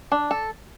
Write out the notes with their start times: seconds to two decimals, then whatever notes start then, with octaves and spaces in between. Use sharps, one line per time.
0.12 D4
0.31 A4